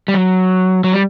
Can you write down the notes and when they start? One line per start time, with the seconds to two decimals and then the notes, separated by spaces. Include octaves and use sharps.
0.08 G3
0.14 F#3
0.84 F#3
0.93 G3